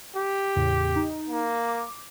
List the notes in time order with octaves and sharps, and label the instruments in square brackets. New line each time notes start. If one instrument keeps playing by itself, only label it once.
[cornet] G4
[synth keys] E2 A2 C#3
D#4
[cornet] A#3
[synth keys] D6